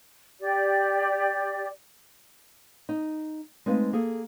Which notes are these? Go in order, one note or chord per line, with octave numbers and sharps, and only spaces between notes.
G4 D5
D#4
G#3 A3 C4 D#4 B4 F5
A#3 G#4 A4